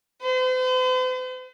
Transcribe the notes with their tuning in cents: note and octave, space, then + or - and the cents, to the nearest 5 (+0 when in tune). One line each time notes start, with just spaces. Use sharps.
C5 -45